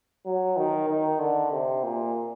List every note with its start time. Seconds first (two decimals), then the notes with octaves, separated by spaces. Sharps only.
0.25 F#3
0.57 D#3
0.89 D#3
1.20 D3
1.52 C3
1.83 A#2